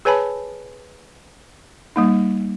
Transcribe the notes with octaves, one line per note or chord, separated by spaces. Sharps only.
G#4 B4 C#5 G#5 A5 B5
G3 A#3 D#4